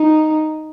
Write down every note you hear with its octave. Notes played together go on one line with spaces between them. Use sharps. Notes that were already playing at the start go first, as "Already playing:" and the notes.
Already playing: D#4